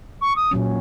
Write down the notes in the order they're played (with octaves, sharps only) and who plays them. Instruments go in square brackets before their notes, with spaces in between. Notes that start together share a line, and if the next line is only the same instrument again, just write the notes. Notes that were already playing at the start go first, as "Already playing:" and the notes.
[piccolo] C#6
D#6
[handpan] A#2 F#3 C#4